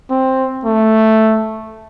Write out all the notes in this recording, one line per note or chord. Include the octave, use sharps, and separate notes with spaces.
C4
A3